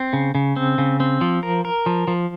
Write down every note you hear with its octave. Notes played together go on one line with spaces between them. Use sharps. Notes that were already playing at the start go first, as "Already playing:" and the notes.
Already playing: C4
C#3
C#3
C4
C#3
C4
F3
A#4
A#4
F3
F3